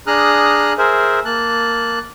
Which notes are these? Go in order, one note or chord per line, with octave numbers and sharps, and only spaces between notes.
D4 G#4 A#5 D#6 F6 F#6
G#4 A#4 C5 E5
A#3 A5 F#6